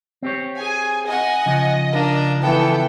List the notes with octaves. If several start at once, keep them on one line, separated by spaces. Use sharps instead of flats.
C4 G4 C#5
G#4 G#5
D#5 F#5 G#5
C#3 F3
A#3 D4
E3 B3 A4 G5